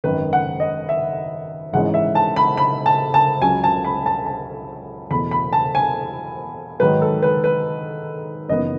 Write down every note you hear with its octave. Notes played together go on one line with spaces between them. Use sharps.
G#1 F#2 D#3 B4
F#5
D#5
E5
G#1 G#2 E3 G#3 C#4 F#5
E5
A5
B5
B5
A5
A5
C#2 C#3 F#3 C#4 G#5
A5
B5
A5
A5
E2 B2 A3 B5
B5
A5
G#5
G#2 D#3 F#3 B4
A4
B4
B4
F#1 F#2 E3 B3 D#4 D#5